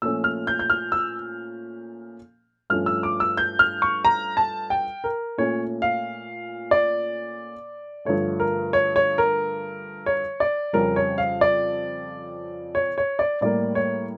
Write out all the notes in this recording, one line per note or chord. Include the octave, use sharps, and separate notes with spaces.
A#2 F3 A3 C#4 E6
F6
G6
G6
F6
E6
G2 F3 A3 C#4 F6
E6
D6
E6
G6
F6
C#6
A#5
A5
G5
A#4
A#2 A3 C#4 C#5
F5
D5
G2 D3 F3 A3 C#5
A#4
C#5
C#5
A#4
C#5
D5
F2 C#3 G3 C#4 A#4
C#5
F5
D5
C#5
C#5
D5
A2 G3 A#3 D5
C#5